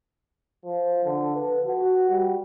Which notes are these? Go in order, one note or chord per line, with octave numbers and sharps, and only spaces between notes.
F3
D3
B4
F#4
G3